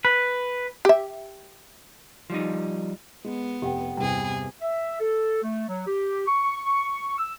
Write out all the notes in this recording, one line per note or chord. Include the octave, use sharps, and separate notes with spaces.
B4
G4 E5
F3 G3 D#4
G#3 B3
F1 G4 F#5 G5
E2 G2 C3 G#4 G5
E5
A4
A3
F#3
G4
C#6
E6